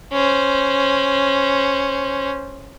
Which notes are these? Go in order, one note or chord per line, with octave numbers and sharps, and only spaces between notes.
C#4 C5